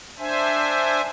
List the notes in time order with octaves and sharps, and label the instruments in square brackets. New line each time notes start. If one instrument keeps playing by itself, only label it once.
[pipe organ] D4 C5 E5 G#5